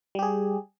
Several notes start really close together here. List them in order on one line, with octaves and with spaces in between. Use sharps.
G3 G4 G#4